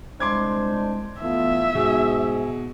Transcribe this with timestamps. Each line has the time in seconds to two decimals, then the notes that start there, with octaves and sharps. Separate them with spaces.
0.20 C2 G#3 D4 C5 C6 D6 G#6
1.22 E3 A3 B3 F4 E5
1.75 G#2 B2 G#4